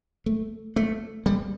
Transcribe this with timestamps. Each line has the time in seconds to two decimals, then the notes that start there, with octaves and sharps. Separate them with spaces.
0.26 A3
0.76 A3
1.26 G3